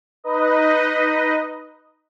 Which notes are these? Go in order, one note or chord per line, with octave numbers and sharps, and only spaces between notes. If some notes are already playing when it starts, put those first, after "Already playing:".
D#4 B4 D#5